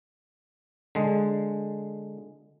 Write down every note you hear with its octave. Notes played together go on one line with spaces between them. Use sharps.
D3 G#3